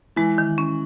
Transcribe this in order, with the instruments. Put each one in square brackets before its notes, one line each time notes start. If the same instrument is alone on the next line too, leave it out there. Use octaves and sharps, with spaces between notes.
[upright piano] E3 [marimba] G#3
[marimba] D#3
C#4